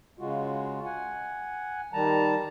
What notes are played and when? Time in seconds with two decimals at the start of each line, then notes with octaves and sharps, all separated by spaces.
0.19 C#3 G#3 F4 F#4
0.85 F#5 G#5
1.93 D#3 G3 A5 A#5